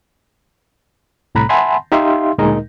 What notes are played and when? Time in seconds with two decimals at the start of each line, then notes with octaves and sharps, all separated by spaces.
1.35 C2 A2 A#5 B5 F#6
1.49 E5 F#5 G#5 A5 B5 C6
1.92 D#4 G4 E5 F5 C6
2.38 D2 A#2 G#3 D#4 A#4 D#5